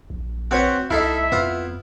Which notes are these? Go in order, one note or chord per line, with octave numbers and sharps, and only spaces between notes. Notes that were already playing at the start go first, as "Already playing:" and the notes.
A#1
C4 F#4 B4 C#5 F#5
C2 D#4 E4 A4 E5 F5
F2 B3 F4